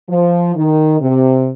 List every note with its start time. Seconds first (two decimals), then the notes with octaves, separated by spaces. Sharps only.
0.09 F3
0.55 D#3
1.01 C3